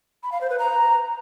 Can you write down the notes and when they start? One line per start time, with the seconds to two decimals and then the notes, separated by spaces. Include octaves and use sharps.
0.23 B5
0.32 F5
0.41 C5
0.50 B4
0.59 A#5